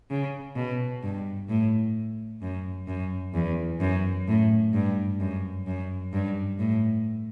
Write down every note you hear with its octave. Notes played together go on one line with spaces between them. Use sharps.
C#3
B2
G2
A2
F#2
F#2
E2
F#2
A2
G2
F#2
F#2
G2
A2